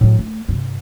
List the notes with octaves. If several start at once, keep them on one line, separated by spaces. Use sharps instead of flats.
A2 F#3
A3
G2 C3